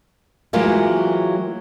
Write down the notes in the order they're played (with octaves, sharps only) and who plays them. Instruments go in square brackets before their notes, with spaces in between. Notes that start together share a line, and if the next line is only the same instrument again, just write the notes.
[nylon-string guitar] E3 F#3 G#3 A#3 F4 G4